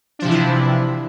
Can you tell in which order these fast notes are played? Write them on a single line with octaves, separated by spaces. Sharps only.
D4 F3 C3 E3 E4